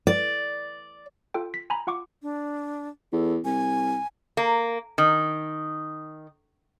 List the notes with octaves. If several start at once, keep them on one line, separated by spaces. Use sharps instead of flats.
D5
F4 A4 G5
B6
G#5 A#5 B5
F4 F#5 C#6 D6
D4
E2 A4
C2 G#5
A#3
D#3